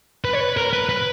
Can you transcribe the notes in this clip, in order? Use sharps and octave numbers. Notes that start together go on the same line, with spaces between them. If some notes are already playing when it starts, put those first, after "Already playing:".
B4
C#5
B4
A#4
B4
B4